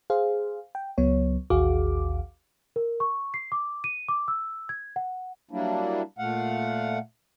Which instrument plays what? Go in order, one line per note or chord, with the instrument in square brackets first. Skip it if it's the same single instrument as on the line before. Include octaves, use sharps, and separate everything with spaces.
[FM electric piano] G#4 C5 F5
G5
C#2 F#3 B3 C#5
A1 D#2 F#4 G#4 F5 D6
[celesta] A#4
C#6
C7
D6
D#7
D6
E6
G#6
F#5
[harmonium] F#3 G3 A#3 D4 E4
A#2 A3 F5 F#5